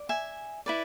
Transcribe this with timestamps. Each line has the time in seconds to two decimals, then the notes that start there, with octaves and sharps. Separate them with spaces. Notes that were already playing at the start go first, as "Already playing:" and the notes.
Already playing: D5
0.09 E5 G#5
0.66 E4 B4 D5